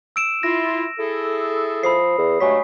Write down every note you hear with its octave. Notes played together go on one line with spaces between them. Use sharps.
E6 D7 E7
E4 F4 A#6
E4 G#4 A4
F3 B5 D#6 C7
E2
G2 F#3 G#3 A3 G#5 C#6 B6